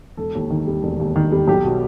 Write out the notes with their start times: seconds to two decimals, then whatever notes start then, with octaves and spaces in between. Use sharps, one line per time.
0.17 E1 A4
0.35 D#2
0.50 D#3
0.67 G3
0.83 E1
1.00 D#2
1.16 D#3
1.32 G3
1.47 B1 G4
1.64 B2